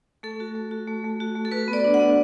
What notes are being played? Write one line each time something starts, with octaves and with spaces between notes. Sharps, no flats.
A3 A4
F#4
A3
F#4
A3
A3
F#4
A3
A4
F#4 B4
B3
D5
D4
F#5
B3